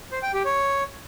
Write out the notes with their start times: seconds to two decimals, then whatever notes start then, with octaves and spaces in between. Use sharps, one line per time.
0.12 C5
0.23 G5
0.34 G4
0.45 C#5